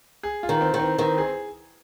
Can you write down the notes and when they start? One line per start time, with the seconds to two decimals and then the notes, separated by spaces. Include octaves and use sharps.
0.23 G#4
0.43 F4
0.49 D#3
0.61 C4
0.74 D#3
0.80 C4
0.98 D#3 C4
1.18 G#4